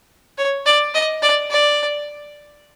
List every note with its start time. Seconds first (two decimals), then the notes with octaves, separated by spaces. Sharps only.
0.38 C#5
0.66 D5
0.94 D#5
1.22 D5
1.50 D5